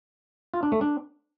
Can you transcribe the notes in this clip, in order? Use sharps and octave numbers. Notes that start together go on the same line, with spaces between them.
F4
D4
A3
D4